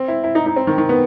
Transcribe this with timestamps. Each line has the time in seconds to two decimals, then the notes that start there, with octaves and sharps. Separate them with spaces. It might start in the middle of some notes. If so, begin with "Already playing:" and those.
Already playing: C4
0.08 E4
0.24 E4
0.35 D#4
0.46 D#4
0.56 C4
0.67 D#3
0.78 D#3
0.89 B3